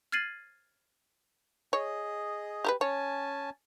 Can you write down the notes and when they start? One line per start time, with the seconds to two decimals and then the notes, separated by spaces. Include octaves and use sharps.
0.12 F6 G#6 A6 C7 D#7 F#7
1.73 G#4 C#5 D#5
2.64 G4 A#4 B4
2.81 C#4 C#5 G#5 A5